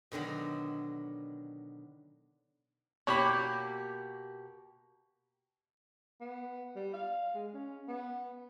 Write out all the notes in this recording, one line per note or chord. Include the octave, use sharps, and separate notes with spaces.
B2 D3 D#3 F#3
B2 A#3 G4 C#5 B5
B3
G3
F5
G#3
C#4
B3